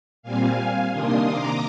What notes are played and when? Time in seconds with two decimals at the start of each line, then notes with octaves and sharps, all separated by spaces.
0.23 A#2 G3 C4 F5 G#5
0.90 C3 D#3 A#3 D4 C6 D#6
1.25 A#5 D6